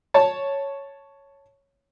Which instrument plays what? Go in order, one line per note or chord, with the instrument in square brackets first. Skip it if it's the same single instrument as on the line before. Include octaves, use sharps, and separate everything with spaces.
[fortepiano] C#5 A5